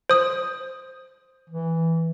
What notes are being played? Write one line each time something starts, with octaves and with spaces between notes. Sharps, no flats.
C5 D#6
E3